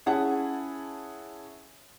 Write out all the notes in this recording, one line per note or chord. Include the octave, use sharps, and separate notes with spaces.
C#4 E4 G#4 F#5 A5